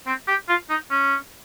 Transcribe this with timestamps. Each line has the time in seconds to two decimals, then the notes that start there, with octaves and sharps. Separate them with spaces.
0.07 C4
0.28 G4
0.49 F4
0.70 D#4
0.90 C#4